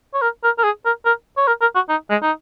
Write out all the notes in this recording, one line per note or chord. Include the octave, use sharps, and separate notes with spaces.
C#5
A#4
A#4
A#4
G#4
A#4
A#4
C#5
A#4
A#4
F#4
D#4
G#3
D#4